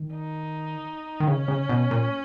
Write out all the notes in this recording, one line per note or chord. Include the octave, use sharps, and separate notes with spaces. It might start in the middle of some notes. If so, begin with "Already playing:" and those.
Already playing: D#3
D#4
D#3
C#3 C#4
C#3
B2
A#2